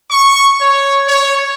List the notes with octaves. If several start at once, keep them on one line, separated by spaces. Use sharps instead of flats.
C#6
C#5
C#5